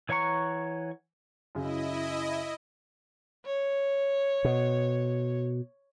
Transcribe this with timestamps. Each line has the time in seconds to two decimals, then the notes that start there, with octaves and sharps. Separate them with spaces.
0.09 E3 C#5 F#5 A#5 C#6
1.55 F#2 C#3 E4 D#5
3.45 C#5
4.44 B2